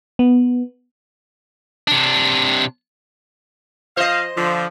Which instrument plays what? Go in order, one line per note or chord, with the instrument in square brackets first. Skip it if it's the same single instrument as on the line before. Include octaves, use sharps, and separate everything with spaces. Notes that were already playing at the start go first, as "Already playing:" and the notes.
[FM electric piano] B3
[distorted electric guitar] C3 D4
[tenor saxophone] F3 [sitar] C5 D#5 [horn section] F5
[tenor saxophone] D3 [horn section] F3